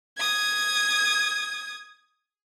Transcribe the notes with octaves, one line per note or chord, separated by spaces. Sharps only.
D#6 G#6